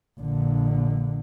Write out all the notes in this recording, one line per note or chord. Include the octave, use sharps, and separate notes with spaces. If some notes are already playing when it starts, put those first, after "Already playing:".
A#1 D3